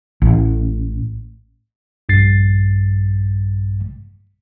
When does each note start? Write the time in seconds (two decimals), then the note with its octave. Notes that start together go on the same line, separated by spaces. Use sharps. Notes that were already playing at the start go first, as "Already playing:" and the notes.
0.22 A1
2.09 A#1 G2 A6 C7